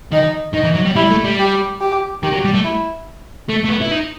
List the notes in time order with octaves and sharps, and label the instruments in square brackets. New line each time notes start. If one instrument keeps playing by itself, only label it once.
[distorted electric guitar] D#3 [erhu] D#4
[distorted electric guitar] D#3 [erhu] D#4
[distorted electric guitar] E3
F#3
G3
[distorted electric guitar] G3 [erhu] E4
[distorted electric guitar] A3
G3
[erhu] G4
G4
[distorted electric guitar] D#3 [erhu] G4
[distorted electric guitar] F#3
G3
A3
[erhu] E4
[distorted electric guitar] A3
A3
B3
E4
D#4